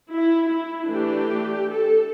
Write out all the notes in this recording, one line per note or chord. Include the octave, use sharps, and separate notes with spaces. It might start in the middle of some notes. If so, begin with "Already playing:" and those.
E4
E4
E3 A3 D4 G4
A4